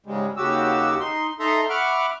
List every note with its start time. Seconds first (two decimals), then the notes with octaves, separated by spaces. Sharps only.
0.06 G#2 C#3 G3 G#3
0.37 D#2 C#3 F#4 G4 E6
1.00 D#4 C6
1.39 D#4 A4 E5 A#5 C6
1.69 E5 F#5 B5 C#6 D6 F6